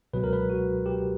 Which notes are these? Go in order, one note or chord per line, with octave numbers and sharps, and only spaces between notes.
C#2 B2 F#3 B4
A#4
B4
F#4
G4